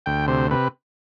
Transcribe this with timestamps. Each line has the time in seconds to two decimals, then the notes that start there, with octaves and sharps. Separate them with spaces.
0.06 D2 G5
0.28 C3 C5
0.51 C3 B4